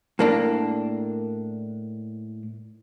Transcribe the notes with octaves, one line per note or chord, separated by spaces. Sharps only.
A2 A#3 D4